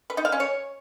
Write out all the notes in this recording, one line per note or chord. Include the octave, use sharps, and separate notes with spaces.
B4
D#4
F5
C#4
C#5